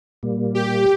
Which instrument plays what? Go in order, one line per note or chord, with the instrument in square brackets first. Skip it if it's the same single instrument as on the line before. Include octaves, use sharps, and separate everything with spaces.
[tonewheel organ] A#2 G3 A#3
[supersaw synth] G4